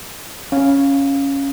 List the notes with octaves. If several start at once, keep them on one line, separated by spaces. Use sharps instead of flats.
C#4 F5